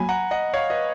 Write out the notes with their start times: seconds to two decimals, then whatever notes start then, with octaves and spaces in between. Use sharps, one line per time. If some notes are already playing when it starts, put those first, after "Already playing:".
Already playing: F#3 A#3 G#5 B5
0.09 F#5 A#5
0.31 D#5 F#5
0.54 C#5 F5
0.70 B4 D#5